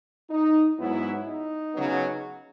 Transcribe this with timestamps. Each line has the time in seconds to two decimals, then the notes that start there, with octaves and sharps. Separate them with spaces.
0.29 D#4
0.77 G#2 F#3 B3 E4
1.25 D#4
1.73 C#3 F#3 B3